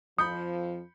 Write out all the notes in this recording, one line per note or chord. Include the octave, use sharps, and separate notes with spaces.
F2 F3 B5 D#6 G6 C#7